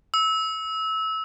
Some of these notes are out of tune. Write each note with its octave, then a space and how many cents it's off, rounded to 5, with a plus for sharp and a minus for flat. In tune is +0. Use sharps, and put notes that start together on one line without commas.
E6 -20